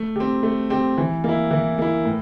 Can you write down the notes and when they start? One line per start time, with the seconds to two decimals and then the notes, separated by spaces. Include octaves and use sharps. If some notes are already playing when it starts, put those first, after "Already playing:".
Already playing: A3
0.16 C4 G4
0.43 A3
0.70 C4 G4
0.98 E3
1.24 A#3
1.29 E4
1.51 E3
1.78 A#3 E4
2.05 A2